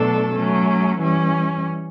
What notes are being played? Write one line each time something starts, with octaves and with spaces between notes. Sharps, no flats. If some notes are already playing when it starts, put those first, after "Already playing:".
Already playing: B2 F#3 A3 D4 A4
F#3 A3 C#4
E3 G3 C#4